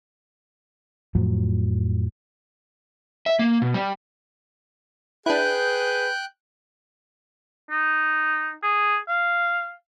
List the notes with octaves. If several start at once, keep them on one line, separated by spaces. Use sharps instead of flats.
F2 A2 F3 F#3
E5
A#3
B2
G3
D4 E4 G#4 B4 G5 F#6 G6
D#4
G#4
F5